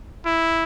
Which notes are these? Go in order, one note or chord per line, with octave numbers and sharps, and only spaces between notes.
E4